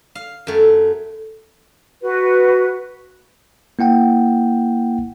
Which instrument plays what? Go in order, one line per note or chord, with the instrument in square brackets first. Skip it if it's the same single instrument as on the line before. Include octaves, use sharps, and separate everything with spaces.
[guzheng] F5
F#2 A3
[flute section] F#4 B4
[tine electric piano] A#3 E4 F#5 G5